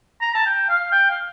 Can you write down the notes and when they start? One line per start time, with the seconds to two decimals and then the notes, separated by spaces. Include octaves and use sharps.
0.22 A#5
0.34 A5
0.46 G5
0.69 F5
0.92 G5
1.10 F5